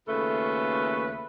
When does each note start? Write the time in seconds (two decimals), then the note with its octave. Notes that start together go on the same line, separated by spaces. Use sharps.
0.08 D#2 C#3 A3 F4 A4 B4